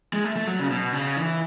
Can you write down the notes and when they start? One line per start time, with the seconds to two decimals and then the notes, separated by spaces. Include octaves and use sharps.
0.13 G#3
0.24 A3
0.36 A3
0.47 F#3
0.59 C#3
0.70 B2
0.93 C#3
1.16 E3